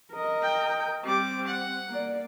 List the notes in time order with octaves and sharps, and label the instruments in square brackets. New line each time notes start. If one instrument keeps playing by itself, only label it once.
[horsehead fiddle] A#4 D#5
[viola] G5
[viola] G3 D6 [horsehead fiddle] C4
[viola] F#5
[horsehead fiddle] A#3 D5